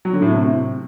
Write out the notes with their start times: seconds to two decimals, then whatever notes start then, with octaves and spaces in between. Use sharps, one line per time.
0.05 F#3
0.13 D3
0.22 A2
0.30 C3